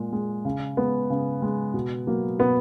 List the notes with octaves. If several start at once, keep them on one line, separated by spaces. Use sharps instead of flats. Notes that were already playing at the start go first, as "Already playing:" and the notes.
Already playing: A#2 G#3
G#3
C#3
G#3 B3
C#3
G#3
B2
F#3 A#3
B2 B3